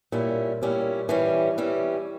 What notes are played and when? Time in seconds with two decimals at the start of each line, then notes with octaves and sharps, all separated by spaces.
0.12 A#2 G3 C#4 E4
0.61 A#2 G3 C#4 E4
1.09 E3 G3 C#4
1.58 E3 G3 C#4